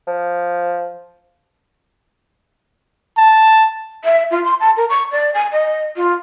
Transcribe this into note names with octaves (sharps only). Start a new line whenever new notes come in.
F3
A5
E5
F4
C6
A5
A#4
C#6
D5
G#5
D#5
F4